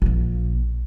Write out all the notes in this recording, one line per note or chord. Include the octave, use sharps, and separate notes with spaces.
A#1 A#3